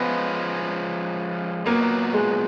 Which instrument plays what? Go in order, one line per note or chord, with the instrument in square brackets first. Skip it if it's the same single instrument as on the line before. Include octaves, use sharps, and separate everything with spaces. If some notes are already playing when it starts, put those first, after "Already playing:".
Already playing: [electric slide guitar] F3 G#3 C#4 F4 [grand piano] B3
[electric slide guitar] A#2 F#3 B3 [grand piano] A#3
[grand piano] G#3